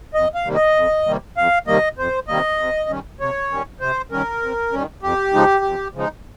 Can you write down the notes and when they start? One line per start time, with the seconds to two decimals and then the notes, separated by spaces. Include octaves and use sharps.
0.14 F2 D#5
0.34 F5
0.45 C3 D#3 G3 A#3
0.55 D#5
0.76 F2
1.06 C3 D#3 G3 A#3
1.37 F2 F5
1.67 C3 D#3 G3 A#3 D#5
1.98 F2 C5
2.28 C3 D#3 G3 A#3 D#5
2.59 C3
2.89 D#3 G3 C#4
3.20 C3 C#5
3.51 D#3 G3 C#4
3.80 C3 C5
4.11 D#3 G3 C#4 A#4
4.42 C3
4.72 D#3 G3 C#4
5.03 F2 G4
5.33 C#3 F3 G#3 D#4
5.64 F2
5.95 C#3 F3 G#3 D#4